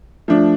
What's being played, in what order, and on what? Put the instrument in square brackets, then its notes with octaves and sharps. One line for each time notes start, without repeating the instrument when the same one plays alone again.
[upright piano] F3 A3 D4